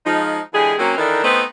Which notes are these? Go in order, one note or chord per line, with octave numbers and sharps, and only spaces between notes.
F3 G#3 D#4
D3 E3 G#3 G4 G#4
F#3 A#3 C4 C#4
D#3 E3 D4 D#4 A4 A#4
A3 B3 C4 D#4 B4 C5